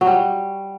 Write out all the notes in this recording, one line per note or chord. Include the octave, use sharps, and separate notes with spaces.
F#3
G3